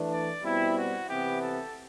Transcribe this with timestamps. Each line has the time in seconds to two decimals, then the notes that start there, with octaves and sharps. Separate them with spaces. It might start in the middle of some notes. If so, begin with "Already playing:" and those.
Already playing: E3 A3 D4
0.12 D5
0.44 B2 G3 C4 E4
0.77 F#4
1.08 C3 E3 B3 G4
1.42 A4